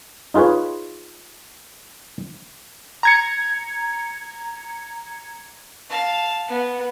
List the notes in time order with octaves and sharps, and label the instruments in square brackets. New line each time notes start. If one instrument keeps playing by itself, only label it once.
[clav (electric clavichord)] D#4 F4 G#4 B4 C#5
[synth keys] A#5 G#6 C#7
[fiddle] F5 A5
B3